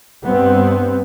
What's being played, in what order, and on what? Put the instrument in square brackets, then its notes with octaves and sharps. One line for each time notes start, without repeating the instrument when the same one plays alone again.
[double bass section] G2 B3 C4